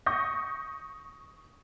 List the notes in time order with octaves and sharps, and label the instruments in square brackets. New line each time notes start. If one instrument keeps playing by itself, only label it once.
[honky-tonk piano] C#6 D#6 G6 A#6